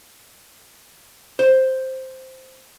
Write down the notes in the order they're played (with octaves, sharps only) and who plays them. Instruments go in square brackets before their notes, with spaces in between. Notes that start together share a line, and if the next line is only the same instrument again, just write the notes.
[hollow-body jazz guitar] C5